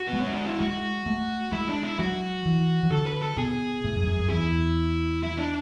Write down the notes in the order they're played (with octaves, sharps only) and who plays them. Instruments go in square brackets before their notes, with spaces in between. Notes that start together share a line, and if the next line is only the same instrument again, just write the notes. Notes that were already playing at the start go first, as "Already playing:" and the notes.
Already playing: [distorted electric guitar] F#4
[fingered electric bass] G#3 [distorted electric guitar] B3
[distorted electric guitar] C#4
D4
E4
[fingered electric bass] G#3 [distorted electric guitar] F#4
[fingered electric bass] A3
[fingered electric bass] G#3 [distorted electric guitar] E4
[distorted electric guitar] D4
E4
[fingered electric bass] F#3 [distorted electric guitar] F#4
[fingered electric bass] E3
E3
[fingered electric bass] D3 [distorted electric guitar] A4
[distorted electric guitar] B4
A4
[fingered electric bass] B2 [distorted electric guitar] G#4
[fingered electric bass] A2
F#2
F#2
F#2
[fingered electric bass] E2 [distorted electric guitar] E4
[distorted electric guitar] E4
D4